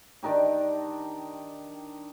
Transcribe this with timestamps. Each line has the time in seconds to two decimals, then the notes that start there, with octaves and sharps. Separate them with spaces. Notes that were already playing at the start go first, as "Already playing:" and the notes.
0.23 D#3 D4 D#4 G4